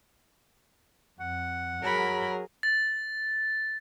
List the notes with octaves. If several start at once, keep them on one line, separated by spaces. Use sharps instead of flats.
F2 F#5
F#3 G#4 A#4 B5
A6